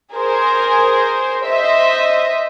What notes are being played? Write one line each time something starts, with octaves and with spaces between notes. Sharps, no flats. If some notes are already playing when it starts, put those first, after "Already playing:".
G#4 A#4 C5
C5 D#5 E5